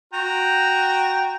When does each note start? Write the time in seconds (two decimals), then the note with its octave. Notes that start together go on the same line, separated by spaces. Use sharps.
0.13 F#4 G5 A#5